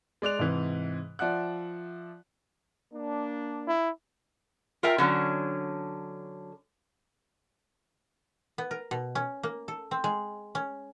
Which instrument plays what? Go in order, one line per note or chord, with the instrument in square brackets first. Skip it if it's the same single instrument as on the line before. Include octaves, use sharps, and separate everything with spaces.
[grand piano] G#3 D5 F#6 F7
G#2 C3 E3
F3 D5 E5 F#5 F#6
[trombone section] A#3 D4
[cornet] E4
[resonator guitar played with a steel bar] F4 A#4 E5 G5
D3 F#3 C#4
[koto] B3
A#4
B2
C#4
A#3
A4
C4
G#3
C#4